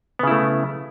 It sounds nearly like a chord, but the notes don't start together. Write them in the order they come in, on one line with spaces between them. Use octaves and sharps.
B3 C#3 E4 A3